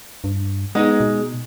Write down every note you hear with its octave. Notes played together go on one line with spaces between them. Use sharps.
G2
G#3 B3 D#4
B2